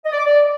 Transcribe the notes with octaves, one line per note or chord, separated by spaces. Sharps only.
D#5
D5
D6
D5